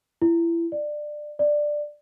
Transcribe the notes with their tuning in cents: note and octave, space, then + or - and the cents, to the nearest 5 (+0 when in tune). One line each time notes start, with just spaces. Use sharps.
E4 +30
D5 +20
D5 +10